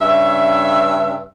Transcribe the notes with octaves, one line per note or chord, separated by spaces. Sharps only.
G2 C#3 C#4 E5